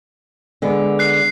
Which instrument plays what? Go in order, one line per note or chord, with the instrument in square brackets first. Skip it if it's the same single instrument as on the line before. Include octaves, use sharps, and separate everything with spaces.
[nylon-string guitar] D3 G#3 B3
[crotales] F#6 C7